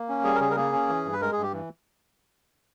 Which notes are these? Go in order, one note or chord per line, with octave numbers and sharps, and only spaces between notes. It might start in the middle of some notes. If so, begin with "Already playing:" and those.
Already playing: A#3
C#4
G3 G#4
A#4
C#3 G#4
A#4
A#3 G#4
C#4
E3
G2
B4
G#3 A#4
G#4
G2
G4
E3